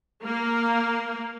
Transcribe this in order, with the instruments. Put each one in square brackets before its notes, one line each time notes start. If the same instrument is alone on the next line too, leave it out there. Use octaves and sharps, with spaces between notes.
[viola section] A#3